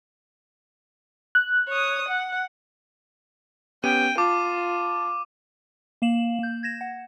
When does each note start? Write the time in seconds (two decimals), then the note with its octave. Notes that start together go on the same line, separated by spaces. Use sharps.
1.35 F#6
1.68 C#5 D#6
2.09 F#5
3.84 B3 C#4 G4 G5 D#7
4.18 F4 A5 D6
6.02 A#3 F5 E7 F#7
6.39 A#3 G6
6.63 G#6 A#6 E7
6.81 F#5